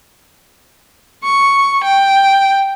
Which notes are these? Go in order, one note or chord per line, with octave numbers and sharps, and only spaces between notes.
C#6
G5